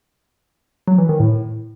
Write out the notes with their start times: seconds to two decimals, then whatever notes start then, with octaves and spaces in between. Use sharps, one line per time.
0.88 F#3
0.98 E3
1.09 D#3
1.20 A2